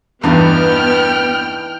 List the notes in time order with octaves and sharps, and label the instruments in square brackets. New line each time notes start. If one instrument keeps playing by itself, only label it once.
[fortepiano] E2 G2 [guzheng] E3 D#4 E4 [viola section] B3 [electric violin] G5 F6